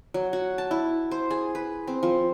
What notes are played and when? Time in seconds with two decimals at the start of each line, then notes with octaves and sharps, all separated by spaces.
0.14 F#3
0.33 F#4
0.58 A5
0.71 E4
1.11 C5
1.30 G#4
1.55 B4
1.87 C4
2.03 F3